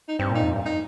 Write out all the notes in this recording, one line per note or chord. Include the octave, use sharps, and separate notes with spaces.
D#4
G2 C4
A#2 D#4
F2
G2
D#4